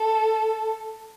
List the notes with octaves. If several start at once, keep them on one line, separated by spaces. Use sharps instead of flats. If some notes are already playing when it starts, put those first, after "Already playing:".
Already playing: A4